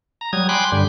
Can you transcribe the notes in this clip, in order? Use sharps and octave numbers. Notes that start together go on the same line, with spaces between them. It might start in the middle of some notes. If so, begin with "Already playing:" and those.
A#5
F#3 G3 D#6 G#6
G5 G#5 B5 C6 D6 F#6
G2 D3 G3